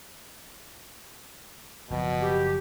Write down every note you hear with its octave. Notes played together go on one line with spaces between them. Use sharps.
F#1 B2 F3
G4